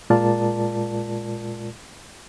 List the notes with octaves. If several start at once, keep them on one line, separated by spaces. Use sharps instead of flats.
A#2 G#3 F4 A#4 D5 A5